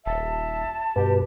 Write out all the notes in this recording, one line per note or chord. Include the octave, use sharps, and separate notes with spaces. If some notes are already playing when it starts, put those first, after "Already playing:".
D#1 E5 A5
G2 B2 G4 B4